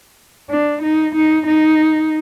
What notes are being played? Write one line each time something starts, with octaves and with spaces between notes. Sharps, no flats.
D4
D#4
D#4
D#4